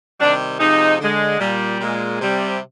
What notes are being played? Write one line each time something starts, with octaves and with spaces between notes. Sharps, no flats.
C3 D#3 G3 D4
C3 F3 G#3 D#4
D3 G#3
A#2 G3
A#2 G#3
C3 G3